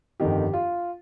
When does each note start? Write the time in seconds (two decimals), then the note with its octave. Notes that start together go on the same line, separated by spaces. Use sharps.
0.20 G1 F2 D#3 G4
0.53 F4